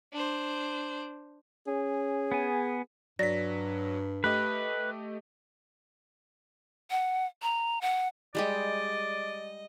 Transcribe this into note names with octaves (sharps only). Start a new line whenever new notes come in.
D4 C5
C#4 G#4
B3 G#5
G2 F#3 D5 A#6 B6
A3 G4 B4 D#5
F#5
A#5
F#5
G3 G#3 G4 D5 D#5